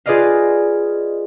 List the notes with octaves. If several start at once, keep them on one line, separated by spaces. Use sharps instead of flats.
F4 G#4 B4 D5 D#5 F5